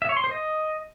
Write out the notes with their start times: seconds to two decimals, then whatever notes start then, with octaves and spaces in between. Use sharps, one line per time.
0.02 E5
0.09 C#5
0.17 C6
0.24 C5
0.31 D#5